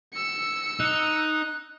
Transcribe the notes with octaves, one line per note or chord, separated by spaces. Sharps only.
E6 C#7
D#4 F#6